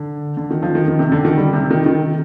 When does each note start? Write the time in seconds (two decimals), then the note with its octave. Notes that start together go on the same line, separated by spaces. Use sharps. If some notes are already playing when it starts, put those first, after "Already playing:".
Already playing: D3
0.37 D3
0.51 D#3
0.62 F3
0.75 D#3
0.88 D#3
0.99 C3
1.12 D3
1.25 D#3
1.37 G3
1.53 C3
1.71 D#3
1.86 D#3